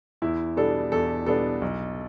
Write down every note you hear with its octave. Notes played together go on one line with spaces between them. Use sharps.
E2 E4
B2 G3 B3 D4 A4
E2 A4
B2 G3 B3 D4 A4
B1